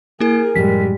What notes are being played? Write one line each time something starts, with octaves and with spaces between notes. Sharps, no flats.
A#3 E4 G#4 A#4
F#2 A2 F3 G3 G#3 B6